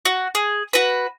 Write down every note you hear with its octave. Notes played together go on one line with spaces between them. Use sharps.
F#4
G#4
F#4 B4